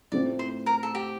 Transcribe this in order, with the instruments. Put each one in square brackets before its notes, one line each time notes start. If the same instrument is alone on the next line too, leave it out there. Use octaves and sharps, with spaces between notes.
[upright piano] A2 A3 C4 F4 [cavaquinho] D5
[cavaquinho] C5
A#4
A4
G4